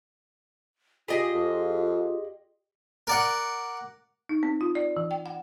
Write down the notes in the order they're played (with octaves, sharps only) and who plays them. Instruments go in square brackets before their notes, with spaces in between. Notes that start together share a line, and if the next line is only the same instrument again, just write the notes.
[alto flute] F4 [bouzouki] G4 G#4 D#5
[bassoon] F2
[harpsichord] A#4 D5 F#5
[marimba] D#4
C4
F4
D5
E3
G5
F#5